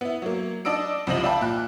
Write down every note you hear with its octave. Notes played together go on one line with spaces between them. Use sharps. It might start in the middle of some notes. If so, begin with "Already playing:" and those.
B3 E4
F#3 A#3
D4 D5 D#5 E6 D7
C2 C3 F3 D#5 F#7
D5 E5 F5 G5 A5 B5
A#2 F#6